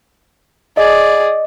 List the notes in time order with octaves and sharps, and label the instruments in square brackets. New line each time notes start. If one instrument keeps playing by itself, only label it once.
[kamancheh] G#4 D5 [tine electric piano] D#5